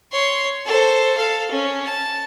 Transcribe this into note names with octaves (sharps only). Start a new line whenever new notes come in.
C#5 C6
A4 C5
A4 F5
C#4
A5